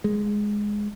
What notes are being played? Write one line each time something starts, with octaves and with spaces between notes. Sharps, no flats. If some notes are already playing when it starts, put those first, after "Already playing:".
G#3